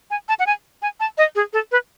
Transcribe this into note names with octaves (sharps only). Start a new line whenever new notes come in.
G#5
A5
F#5
G#5
G#5
A5
D#5
G#4
A4
B4